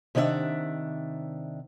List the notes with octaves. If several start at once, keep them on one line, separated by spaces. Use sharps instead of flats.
C3 D#3 D4 G#4 E5 F#5